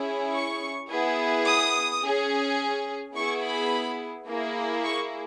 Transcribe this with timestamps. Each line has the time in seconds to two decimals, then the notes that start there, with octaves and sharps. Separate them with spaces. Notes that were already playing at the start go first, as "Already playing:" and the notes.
Already playing: C#4 E4 G#4
0.33 C#6
0.90 B3 E4 G#4
1.46 D#6
2.02 C#4 G#4
3.15 B3 E4 G#4 C#6
3.44 B5
4.28 A#3 E4 G#4
4.85 C#6